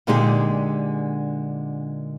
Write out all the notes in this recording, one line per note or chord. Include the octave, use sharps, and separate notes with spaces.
A#2 D3 G#3 D#4 G4 G#4